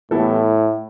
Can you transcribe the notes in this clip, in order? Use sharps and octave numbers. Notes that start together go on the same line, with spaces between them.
A2 E3 G3 B3 E4 A4